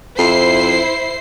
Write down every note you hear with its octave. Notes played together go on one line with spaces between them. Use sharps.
F2 E4 C5 C7